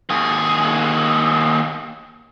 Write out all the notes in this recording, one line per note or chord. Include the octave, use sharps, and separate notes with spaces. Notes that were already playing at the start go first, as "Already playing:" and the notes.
D#2 G#4